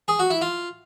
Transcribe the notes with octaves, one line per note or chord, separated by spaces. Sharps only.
G#4
F#4
E4
F4